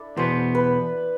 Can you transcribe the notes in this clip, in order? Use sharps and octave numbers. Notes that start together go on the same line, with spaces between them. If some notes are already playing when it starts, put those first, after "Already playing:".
Already playing: D4 E4 A4
E2 B2 B3 C5
B4